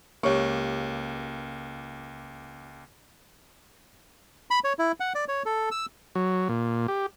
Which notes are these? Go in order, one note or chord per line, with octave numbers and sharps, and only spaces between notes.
C#2 A#3 G4 C#5
B5
C#5
E4
F#5
D5
C#5
A4
E6
F#3
A#2
G4